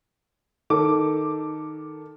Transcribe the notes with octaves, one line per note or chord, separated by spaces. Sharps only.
D#3 A4 D6